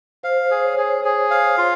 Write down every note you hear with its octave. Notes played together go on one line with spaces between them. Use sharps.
C5 F5
G#4
C#5
G#4
G#4
F5
F4